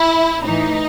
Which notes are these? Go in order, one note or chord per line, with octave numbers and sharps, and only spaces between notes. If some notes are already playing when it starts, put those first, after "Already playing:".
Already playing: E4
A2 E3 D#4